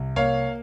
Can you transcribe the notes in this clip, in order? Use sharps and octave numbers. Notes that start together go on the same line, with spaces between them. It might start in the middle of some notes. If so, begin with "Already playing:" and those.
Already playing: C2
A#3 C#5 F5